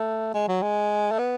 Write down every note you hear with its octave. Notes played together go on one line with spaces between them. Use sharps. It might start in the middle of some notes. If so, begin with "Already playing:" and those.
Already playing: A3
G#3
F#3
G#3
A3
B3